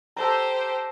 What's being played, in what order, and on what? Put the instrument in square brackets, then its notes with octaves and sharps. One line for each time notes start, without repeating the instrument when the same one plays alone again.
[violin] G4 C5 [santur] A4 A5 A#5